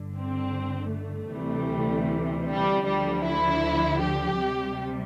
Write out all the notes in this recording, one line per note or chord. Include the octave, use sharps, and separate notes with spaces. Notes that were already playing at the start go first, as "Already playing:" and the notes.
Already playing: G1 G2 D3
C4
A3
D2 C3 E3 G3
G3
D2 D3 F3 G3
E4
G4
D2 C3 G3